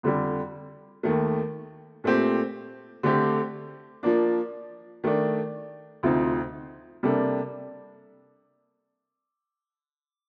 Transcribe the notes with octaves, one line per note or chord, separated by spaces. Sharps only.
F2 D3 G3
D#2 D#3 A3
A#2 A3 C4 G4
D3 A3 C4 G4
F3 A#3 D4
D#3 A3 D4
D2 C3 F3 C4 D#4
C3 G3 A#3 D4 A4